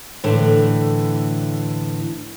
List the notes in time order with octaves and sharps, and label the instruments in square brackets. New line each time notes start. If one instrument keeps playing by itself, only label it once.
[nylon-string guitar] A2 D3 E3 A3